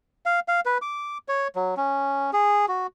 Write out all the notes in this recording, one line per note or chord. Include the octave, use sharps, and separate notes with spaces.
F5
F5
B4
D6
C#5
F#3
C#4
G#4
F#4